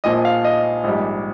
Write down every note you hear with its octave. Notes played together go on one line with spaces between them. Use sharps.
A#1 A#2 F3 D#5
F5
D#5
A#1 G#2 G3